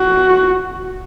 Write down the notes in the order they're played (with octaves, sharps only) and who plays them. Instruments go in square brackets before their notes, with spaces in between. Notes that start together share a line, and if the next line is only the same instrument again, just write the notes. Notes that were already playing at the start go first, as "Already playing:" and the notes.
Already playing: [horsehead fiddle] F#4